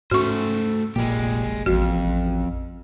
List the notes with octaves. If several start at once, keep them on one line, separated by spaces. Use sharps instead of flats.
G#2 A3 C#4 F#4 C5 C#6
F1 A#1 A#2 G#3 A#3 G4
A1 F2 F#4